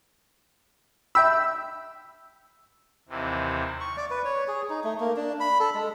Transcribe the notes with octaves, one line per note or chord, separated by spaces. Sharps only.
E5 G5 B5 E6
D#2 C3 E3
C#6
D5
B4
C#5
G#4
D#4
A3
A#3
D4
B5
A4
G#3